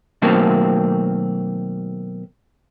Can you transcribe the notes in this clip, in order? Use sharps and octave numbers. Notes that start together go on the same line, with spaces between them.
B2 D#3 F#3 A3 A#3 C4